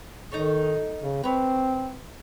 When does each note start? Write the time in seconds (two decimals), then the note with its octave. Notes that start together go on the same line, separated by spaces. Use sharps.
0.32 D#3 D#4 A4 C#5
1.00 C#3
1.24 C4 B4 C#5